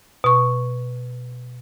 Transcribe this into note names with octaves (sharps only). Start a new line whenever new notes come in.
B2 C#6